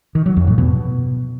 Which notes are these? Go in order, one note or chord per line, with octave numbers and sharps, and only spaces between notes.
D#3
F#3
F2
A2
B2